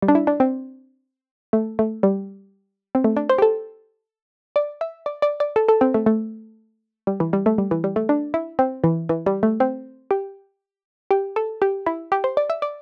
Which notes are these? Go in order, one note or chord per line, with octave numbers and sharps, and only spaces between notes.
G3
D4
E4
D4
C4
A3
A3
G3
C4
A3
D4
C5
G4
A4
D5
E5
D5
D5
D5
A4
A4
C4
A3
A3
G3
E3
G3
A3
G3
E3
G3
A3
D4
E4
C4
E3
E3
G3
A3
C4
G4
G4
A4
G4
E4
G4
C5
D5
E5
D5